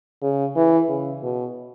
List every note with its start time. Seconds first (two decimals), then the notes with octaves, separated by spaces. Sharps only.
0.22 C#3
0.56 E3
0.88 C#3
1.23 B2